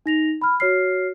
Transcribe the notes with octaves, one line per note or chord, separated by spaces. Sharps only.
D#4 A#6 F7
B5 F6
F#4 C#5 F6 C7